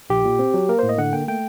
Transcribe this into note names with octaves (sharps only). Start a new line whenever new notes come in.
A#1 G4
A#2
C4
F#3
A#3 A#4
A2 C5
D#5
D3 F#5
A#3 G5
A3 G5